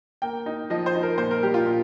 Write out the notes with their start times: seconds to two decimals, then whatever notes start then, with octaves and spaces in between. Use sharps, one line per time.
0.22 A#3 G5
0.46 D#4
0.70 F3 D#5
0.86 C5
0.95 D#4
1.03 A#4
1.18 A#2 C5
1.31 A#4
1.43 G3 G4
1.54 F4
1.66 A#2